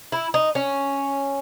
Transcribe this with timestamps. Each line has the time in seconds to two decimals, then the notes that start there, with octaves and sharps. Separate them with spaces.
0.12 E4
0.34 D#4
0.55 C#4